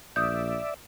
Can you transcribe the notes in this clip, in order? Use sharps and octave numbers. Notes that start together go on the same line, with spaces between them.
A#1 D5 E5 D#6 G6